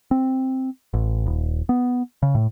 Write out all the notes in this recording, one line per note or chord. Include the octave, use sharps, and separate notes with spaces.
C4
A1
D#1
B3
C#3
A2